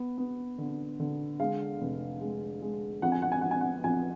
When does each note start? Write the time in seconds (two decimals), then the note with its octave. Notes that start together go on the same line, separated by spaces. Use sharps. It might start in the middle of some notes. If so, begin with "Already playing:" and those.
Already playing: B3
0.18 B3
0.58 D3
1.00 D3
1.40 G#3 F5
1.81 F1
2.21 G#3
2.62 G#3
3.02 F2 F#5
3.12 G#5
3.22 F#5
3.32 G#5
3.41 F2 F#5
3.51 G#5
3.61 F#5
3.84 F2 G#5